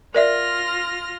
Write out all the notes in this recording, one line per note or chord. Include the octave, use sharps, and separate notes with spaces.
F4 A#4 D5 E5 F6 A#6